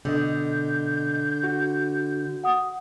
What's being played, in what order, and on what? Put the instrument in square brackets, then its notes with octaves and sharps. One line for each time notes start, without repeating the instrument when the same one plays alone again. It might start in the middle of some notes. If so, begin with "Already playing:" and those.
[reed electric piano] B2 D#5 [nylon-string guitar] D3 [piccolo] G6
[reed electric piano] F#4
[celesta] F#5 D#6